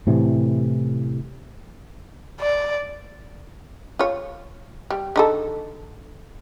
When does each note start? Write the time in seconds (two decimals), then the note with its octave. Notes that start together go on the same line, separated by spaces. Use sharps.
0.07 A2 C3 E3
2.40 D5
3.99 F4 C#5
4.91 G3
5.16 D3 D#4 A4